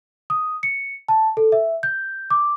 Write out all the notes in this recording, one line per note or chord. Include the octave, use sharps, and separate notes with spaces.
D#6
C#7
A5
A4
E5
G6
D6